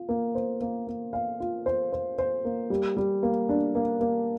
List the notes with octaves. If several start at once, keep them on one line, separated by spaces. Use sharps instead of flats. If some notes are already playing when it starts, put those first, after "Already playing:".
Already playing: F4
A#3
C5
A#3
A#3
F5
F4
C5
C5
C5
A#3
G3
G3
A#3
D4
A#3
A#3